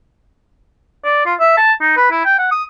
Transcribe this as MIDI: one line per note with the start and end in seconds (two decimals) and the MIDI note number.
1.05 1.22 74
1.26 1.34 65
1.40 1.54 76
1.57 1.72 81
1.81 1.97 63
1.97 2.09 71
2.11 2.23 64
2.25 2.36 79
2.39 2.48 78
2.52 2.64 87